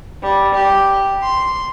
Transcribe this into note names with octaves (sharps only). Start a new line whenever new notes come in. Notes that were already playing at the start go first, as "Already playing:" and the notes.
G3
G4
C6